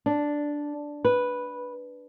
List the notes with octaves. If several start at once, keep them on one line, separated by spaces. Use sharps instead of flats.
D4
B4